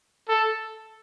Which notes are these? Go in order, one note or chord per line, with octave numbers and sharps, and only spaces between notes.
A4